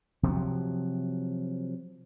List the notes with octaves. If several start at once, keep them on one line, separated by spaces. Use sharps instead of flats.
C3 F3 F#3